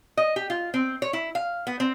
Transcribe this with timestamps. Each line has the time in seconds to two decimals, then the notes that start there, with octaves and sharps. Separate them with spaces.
0.17 D#5
0.36 G4
0.50 F4
0.74 C4
1.02 C#5
1.13 E4
1.35 F5
1.67 B3
1.80 C4